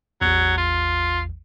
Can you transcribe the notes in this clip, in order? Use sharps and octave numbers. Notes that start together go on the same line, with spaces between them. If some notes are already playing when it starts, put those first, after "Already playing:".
A1 E2 F#3
F4